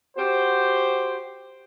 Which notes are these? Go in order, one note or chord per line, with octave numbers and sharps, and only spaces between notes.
F#4 G4 C5